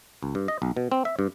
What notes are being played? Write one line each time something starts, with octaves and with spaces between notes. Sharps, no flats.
C#2
G2
D#5
B1
B2
C4
E5
G2